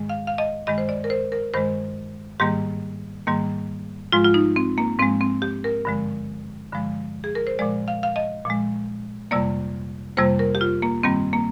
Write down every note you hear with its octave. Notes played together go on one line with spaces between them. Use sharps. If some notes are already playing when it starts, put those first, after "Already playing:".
Already playing: G#2 D#3 G#3
F5
F5
D#5
G2 D#3 G#3 D#5
C5
D5
A#4
C5
A#4
G2 D#3 G#3 C5
G#2 D#3 G3 A#3 G4
G#2 D#3 G3 A#3
G#2 F3 G#3 F4
F4
D#4
C4
A#3
G#2 F3 G#3 C4
C4
G4
A#4
G2 D3 F3 G#3
G2 D3 F3 G#3
G#4
A#4
C5
A#2 F3 G#3 D5
F5
F5
D#5
A#2 F3 G#3
F2 C3 G3 A#3 D5
F2 C3 G3 A#3 C5
A#4
G4
F4
A#3
G2 D#3 G3 A#3 C4
A#3